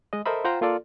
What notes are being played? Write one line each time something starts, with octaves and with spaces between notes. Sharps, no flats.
G#3 D#5
A4 A#4 C5 D#5 E5 B5
F4 C5 F#5 G5 A#5
A#3 F4 A4 D5